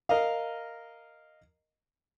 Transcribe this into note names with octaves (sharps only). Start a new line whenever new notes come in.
A#4 D#5 F5